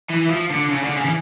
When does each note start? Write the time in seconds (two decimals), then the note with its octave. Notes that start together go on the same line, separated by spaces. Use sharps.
0.10 E3
0.30 F3
0.50 D3
0.70 C#3
0.84 D3
0.97 C#3
1.05 E3